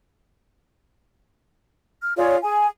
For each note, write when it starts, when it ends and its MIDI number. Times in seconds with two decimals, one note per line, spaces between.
2.01 2.13 89
2.17 2.37 65
2.17 2.37 68
2.17 2.37 73
2.17 2.37 74
2.43 2.66 68
2.43 2.66 80